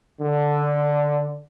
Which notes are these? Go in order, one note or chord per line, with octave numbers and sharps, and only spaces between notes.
D3